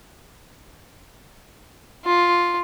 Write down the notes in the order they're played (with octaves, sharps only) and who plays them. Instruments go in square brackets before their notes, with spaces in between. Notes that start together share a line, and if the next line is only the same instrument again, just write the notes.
[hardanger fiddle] F4